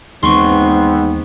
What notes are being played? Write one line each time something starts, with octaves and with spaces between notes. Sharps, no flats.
D#2 G#2 E3 B3 C4 C6 C#6